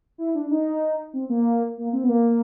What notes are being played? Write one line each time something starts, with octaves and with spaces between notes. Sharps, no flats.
E4
D4
D#4
C4
A#3
A#3
C4
B3
A#3